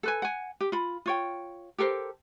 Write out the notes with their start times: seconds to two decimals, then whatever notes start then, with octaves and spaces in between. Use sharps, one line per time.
0.03 A4 B4 G#5
0.22 F#5 G#5
0.61 G4
0.72 F4 B5
1.06 F4 C#5 G5
1.78 G4 A4 A#4 C5